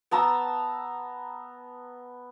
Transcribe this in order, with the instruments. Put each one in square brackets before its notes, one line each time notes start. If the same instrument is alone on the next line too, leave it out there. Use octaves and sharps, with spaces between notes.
[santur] B3 A5 A#5 E6